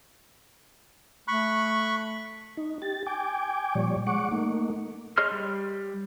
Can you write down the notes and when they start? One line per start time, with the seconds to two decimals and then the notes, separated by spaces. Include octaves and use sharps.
1.28 A3 B5 C#6 F#6
2.57 D#4
2.82 G4 A6
3.07 G5 G#5 D6
3.75 A#2 F3 G3 C#5 D5
4.07 G#3 F#5 C#6 D6
4.31 A3 A#3 D#4
5.18 G#4 C#5 D#5 C6 F6
5.31 G3